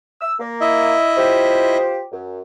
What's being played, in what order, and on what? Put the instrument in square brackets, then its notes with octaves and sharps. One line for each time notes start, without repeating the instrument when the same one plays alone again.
[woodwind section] E6
A#3
[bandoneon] E4 D#5 E5
[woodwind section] F4 G4 C5
F#2